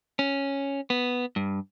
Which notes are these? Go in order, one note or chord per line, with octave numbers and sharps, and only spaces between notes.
C#4
B3
G2